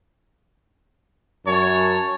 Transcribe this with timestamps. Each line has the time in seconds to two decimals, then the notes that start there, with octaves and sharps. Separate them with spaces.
1.46 F#2 C#5 A5